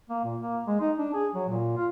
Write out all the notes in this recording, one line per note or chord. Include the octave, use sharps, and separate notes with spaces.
A#3
A#2
A#3
G#3
D#4
D4
G#4
F#3
A#2
F4